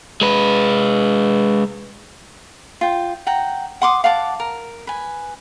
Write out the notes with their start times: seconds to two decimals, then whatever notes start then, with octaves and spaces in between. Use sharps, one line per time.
0.21 G#3 B4
2.81 F4 G5
3.26 F#5 G5 A#5
3.82 F#5 C6 D6 D#6
4.04 F5 F#5 A5 D6
4.40 A#4
4.87 B4 G#5